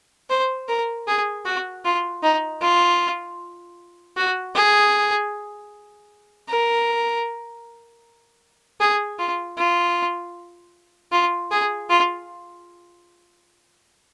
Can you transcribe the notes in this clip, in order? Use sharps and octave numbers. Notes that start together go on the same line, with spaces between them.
C5
A#4
G#4
F#4
F4
D#4
F4
F#4
G#4
A#4
G#4
F4
F4
F4
G#4
F4